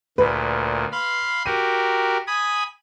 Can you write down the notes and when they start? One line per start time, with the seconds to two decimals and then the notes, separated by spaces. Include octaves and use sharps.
0.18 D2 A#2 B4
0.92 F5 B5 C6
1.46 F#4 G4 A#4 D#7
2.27 G#5 B5 D#6